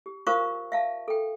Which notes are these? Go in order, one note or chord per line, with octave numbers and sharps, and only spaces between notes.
G4
F4 A#4 C5 F5 C#6 D#6
E5 F5 A5
A4 G5